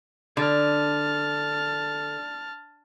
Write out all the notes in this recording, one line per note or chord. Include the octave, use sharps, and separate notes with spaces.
D3 A5 F6